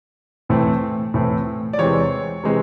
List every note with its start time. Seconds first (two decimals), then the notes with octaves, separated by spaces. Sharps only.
0.49 A2 E3 A3 C4
1.14 A2 E3 A3 C4
1.73 D5
1.78 E2 C3 E3 G#3 C4 C#5
2.44 C3 E3 G#3 C4